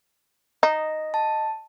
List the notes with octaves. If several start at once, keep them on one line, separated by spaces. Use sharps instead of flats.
D#4 D#5
A5